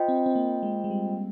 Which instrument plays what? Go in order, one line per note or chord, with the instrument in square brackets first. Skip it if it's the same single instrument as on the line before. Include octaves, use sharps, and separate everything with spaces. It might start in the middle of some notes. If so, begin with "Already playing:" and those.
Already playing: [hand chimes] F4 C5 D#5 G5
[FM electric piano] C4
C4
A#3
G#3
G#3
G3